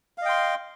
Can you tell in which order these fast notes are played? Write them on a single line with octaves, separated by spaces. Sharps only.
F5 D#5 G5 C6